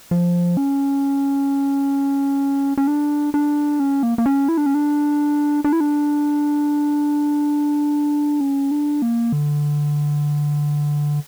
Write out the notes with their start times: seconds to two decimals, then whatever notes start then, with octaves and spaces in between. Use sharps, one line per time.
0.11 F3
0.57 C#4
2.78 C#4
2.87 D4
3.34 D4
3.80 C#4
4.03 A#3
4.18 A#3
4.26 C#4
4.49 E4
4.57 D4
4.66 C#4
4.74 D4
5.64 D4
5.73 E4
5.80 D4
8.41 C#4
8.71 D4
9.02 A#3
9.32 D3